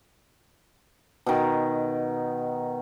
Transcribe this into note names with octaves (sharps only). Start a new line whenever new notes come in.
B2 D#3